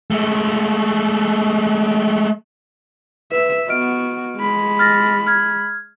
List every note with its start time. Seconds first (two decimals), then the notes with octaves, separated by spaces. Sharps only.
0.11 G#3 A3
3.31 B4 E5
3.68 B3 F#4 D#5 F6 D7
4.37 G#3 B5
4.79 F6 A6 A#6
5.27 F6 G#6